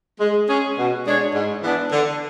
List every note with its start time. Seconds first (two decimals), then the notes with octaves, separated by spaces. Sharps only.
0.20 G#3
0.48 C#4 G#4
0.78 B2
1.06 G#3 D4 G#4 C#5
1.34 G#2
1.63 E3 B3 D4
1.92 D3